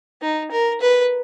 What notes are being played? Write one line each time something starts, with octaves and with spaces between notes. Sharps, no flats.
D#4
A#4
B4